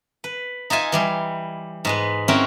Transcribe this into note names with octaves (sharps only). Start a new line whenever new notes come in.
B4
D#4 F4 E5 G#5
E3 G3 C6
G#2 G#3 B4
C4 C#4 E4 F#4 G#4 A#4